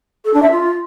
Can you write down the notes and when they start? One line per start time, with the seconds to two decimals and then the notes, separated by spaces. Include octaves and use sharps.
0.25 A4
0.34 D4
0.42 E5
0.51 F4